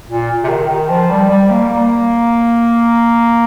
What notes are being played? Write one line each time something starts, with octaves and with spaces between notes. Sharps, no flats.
A#2
C3
D#3
D#3
F3
G3
G3
A#3
A#3